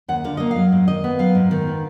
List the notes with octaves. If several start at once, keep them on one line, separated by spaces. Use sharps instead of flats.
D#2 F#5
D3 F5
A#3 D#5
F5
F#3
G#2
D#3 D#5
B3
F#3 F5
G#2
D#3
B3